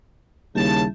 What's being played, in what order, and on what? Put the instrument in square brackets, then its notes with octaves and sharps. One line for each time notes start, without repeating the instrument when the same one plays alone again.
[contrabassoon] D#2 [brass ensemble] C#3 A5 [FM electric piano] G3 E4